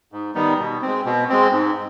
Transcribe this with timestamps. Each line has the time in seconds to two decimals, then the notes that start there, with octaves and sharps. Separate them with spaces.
0.12 G#2
0.35 D#3 G3 B3 D#4
0.59 B2
0.82 G#3 C4
1.05 B2
1.29 G#3 C4
1.52 G#2